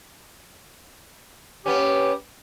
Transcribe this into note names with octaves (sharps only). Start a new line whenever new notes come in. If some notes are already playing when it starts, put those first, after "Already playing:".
B3 C#4 G4